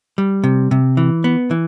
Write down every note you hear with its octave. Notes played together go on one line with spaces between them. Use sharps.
G3
C3
C3
E3
B3
E3